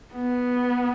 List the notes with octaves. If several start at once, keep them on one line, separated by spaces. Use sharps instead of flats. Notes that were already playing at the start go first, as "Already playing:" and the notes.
B3